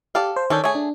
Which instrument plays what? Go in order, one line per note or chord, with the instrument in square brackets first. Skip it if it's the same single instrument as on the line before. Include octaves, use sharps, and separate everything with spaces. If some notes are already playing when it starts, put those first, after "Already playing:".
[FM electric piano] G4 [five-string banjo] A4 D5 F5
[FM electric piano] C5
[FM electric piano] D#3 C#5 G6 [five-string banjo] C#4 D4 A4
[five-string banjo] A3 G#4 [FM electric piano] C#5 G#5
[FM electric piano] D4